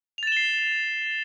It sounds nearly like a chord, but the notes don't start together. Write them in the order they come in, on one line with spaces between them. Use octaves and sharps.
F7 A6 E7 G7 C7